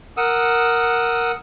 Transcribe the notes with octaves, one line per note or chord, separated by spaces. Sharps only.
A#4 F#5 D#6 E6